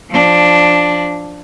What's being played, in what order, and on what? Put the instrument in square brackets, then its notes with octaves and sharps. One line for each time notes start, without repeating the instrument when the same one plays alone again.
[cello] F3 D4